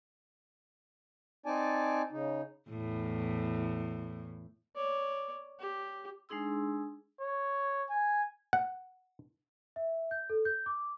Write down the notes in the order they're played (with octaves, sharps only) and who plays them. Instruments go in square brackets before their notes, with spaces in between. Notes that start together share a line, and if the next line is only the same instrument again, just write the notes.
[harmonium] C4 D#4 D5 G#5 A5
C#3 D#4
[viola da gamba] E2 A2
[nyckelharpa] C#5 D5
G4
[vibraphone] G#3 D4 D#4 G#4 C6 E6
[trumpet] C#5
G#5
[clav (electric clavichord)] F#5
[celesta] E5
G6
A4
G6
D6